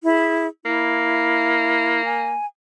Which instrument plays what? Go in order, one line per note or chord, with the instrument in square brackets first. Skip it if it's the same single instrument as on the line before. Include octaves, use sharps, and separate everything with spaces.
[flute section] E4 G#4
[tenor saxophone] A#3 [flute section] E4
[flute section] G#5